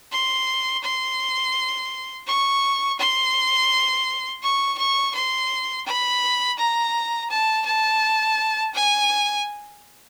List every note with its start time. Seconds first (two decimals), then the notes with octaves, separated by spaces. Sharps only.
0.12 C6
0.83 C6
2.27 C#6
2.99 C6
4.42 C#6
4.78 C#6
5.14 C6
5.86 B5
6.58 A#5
7.30 A5
7.66 A5
8.74 G#5